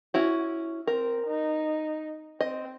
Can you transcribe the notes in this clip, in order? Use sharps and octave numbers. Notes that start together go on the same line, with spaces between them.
C#4 E4 F#4
C4 A#4
D#4
C4 D#5